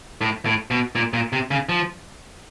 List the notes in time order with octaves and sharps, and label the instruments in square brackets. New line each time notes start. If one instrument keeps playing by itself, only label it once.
[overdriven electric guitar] A2
A2
B2
A#2
A#2
C3
C#3
F3